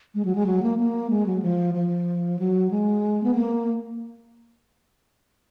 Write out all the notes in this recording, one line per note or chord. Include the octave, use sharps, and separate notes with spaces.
G#3
F#3
G#3
F#3
A#3
A#3
G#3
F#3
F3
F3
F#3
G#3
B3
A#3